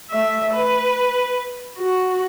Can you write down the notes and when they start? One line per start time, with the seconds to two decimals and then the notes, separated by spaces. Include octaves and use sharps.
0.10 A3 E5
0.54 B4
1.78 F#4